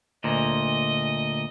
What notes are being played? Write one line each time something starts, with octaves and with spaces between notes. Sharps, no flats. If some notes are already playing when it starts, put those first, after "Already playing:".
D2 A#2 D#5